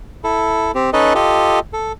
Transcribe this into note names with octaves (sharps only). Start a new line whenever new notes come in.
E4 A4
C4 G4
C#4 D#4 A4 B4 D#5 A5
F4 G4 A4 D#5
A4